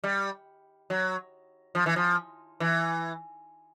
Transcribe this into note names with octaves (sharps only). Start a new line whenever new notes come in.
G3
F#3
F3
E3
F3
E3